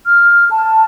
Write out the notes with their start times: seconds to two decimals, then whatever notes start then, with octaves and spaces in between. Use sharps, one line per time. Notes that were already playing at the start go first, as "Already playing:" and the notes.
0.06 F6
0.51 A5